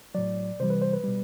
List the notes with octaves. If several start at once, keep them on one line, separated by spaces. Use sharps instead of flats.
A2 F#3 D5
C3 E3 G3 C5
B4
C5
B4
B2 G3